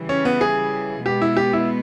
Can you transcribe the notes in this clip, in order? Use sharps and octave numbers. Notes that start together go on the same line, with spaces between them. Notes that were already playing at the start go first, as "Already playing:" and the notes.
Already playing: C#3 E3 G3
C#4
B3
G#4
B2 G#3 B3 G4
E4
G4
E4